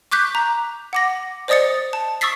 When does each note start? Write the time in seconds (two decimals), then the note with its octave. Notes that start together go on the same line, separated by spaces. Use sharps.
0.11 C#6 D6 F#6 G6 B6
0.35 A#5
0.93 F#5 D6 A#6
1.48 C5 D5 D#5 D#6 A6 C#7
1.93 A5
2.21 C#6 D#6 E6 A6 B6 C7